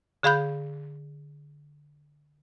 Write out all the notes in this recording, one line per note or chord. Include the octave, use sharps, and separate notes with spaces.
D3 G#4 F5 B5 G6